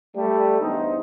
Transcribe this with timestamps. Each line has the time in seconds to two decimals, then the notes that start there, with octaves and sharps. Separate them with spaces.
0.16 G3 A3
0.61 E2 G2 D#4 C5